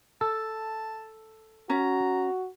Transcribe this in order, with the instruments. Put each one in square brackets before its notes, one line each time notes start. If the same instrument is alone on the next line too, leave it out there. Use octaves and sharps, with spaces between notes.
[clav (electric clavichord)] A4 [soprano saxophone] A5
[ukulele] C#4 [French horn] F#4 [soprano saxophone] A#5